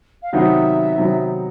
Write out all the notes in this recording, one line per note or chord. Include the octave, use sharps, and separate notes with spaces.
F5
C3 D#3 F#3 B3 D#4 E5
C3 D#3 F#3 B3 D#4